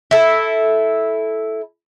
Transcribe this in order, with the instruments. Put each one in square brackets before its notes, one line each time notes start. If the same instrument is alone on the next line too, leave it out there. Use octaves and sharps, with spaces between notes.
[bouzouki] E4 A4